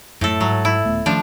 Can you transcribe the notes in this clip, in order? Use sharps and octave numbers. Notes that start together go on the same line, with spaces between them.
F#2 A2 A3 A4
G#2 F#3
E4
D#1 A3 B3
D#3 F3 A3 C#4 D4